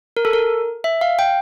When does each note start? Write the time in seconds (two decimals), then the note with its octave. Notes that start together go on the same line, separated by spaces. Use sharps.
0.17 A#4
0.25 A4
0.33 A#4
0.84 E5
1.01 F5
1.19 G5